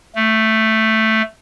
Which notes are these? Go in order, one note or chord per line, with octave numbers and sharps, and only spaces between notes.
A3